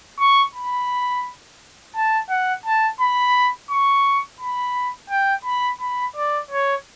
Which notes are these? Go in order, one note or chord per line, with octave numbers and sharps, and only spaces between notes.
C#6
B5
A5
F#5
A5
B5
C#6
B5
G5
B5
B5
D5
C#5